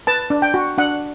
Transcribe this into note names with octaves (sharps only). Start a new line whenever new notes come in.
B4 A5
D4
G5
F#4
D4 F#5